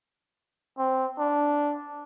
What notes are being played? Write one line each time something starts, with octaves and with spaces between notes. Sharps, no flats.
C4
D4